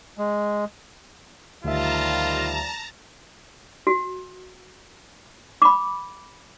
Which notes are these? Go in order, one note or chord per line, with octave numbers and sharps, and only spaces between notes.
G#3
D2 D#3 F3 G3 F4 E5 A5 A#5
F#4
B5 D6